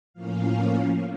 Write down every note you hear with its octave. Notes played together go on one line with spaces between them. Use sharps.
A2 F3 A#3 C#4 F5